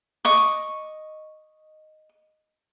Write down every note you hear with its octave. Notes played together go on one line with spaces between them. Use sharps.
D#5 C#6 D6